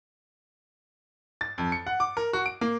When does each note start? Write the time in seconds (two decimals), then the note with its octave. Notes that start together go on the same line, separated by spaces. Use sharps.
1.41 A6
1.58 F2
1.72 C#7
1.87 F#5
2.00 D6
2.17 A#4
2.33 F#4
2.46 D7
2.61 A#3